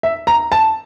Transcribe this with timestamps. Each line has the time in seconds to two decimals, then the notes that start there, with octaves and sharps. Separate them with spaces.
0.03 E5
0.27 A#5
0.52 A5